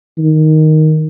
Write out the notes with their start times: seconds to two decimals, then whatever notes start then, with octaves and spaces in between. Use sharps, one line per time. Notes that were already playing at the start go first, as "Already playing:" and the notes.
0.18 D#3